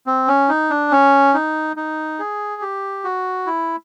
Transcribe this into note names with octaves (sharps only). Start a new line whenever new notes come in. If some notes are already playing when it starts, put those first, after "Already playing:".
C4
C#4
D#4
D4
C#4
D#4
D#4
G#4
G4
F#4
E4